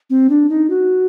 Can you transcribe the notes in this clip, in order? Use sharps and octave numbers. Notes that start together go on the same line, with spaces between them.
C4
D4
D#4
F#4